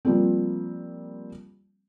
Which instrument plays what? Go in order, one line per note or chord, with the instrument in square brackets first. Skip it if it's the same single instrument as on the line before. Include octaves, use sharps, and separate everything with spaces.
[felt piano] F3 G3 A#3 C4